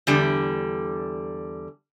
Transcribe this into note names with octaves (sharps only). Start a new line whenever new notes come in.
E2 D3 G3